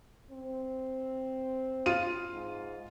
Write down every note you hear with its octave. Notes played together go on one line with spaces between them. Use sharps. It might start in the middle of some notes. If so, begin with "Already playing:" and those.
C4
F4 D#7
G#2